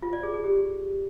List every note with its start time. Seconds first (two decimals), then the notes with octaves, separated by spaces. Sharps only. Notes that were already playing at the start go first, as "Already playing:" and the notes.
0.02 F4
0.13 D5
0.23 G#4
0.34 G#4
0.44 G4